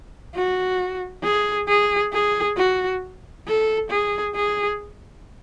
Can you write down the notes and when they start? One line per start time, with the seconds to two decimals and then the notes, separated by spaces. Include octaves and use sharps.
0.35 F#4
1.24 G#4
1.68 G#4
2.13 G#4
2.57 F#4
3.47 A4
3.90 G#4
4.35 G#4